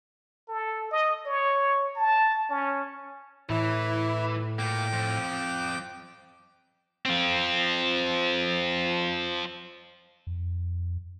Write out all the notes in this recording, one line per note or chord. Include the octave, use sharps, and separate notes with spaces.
A4
D#5
C#5
A5
C#4
A2 E3 E4
A#2 A#3 G5 D6
F2
F3 C4
F2